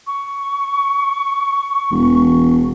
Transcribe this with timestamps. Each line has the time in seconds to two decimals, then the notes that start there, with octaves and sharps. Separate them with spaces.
0.07 C#6
1.92 E1